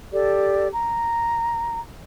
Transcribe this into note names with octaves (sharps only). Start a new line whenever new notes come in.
G4 A4 D5
A#5